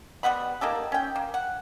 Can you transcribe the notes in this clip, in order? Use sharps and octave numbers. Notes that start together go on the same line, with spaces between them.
G3 B3 F#5 B5
A#3 D#4 G4 A4
C#4 G5
A#3
F#5